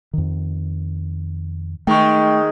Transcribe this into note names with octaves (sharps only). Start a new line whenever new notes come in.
F2 D#3
D#3 G#3 A3 G5 C#6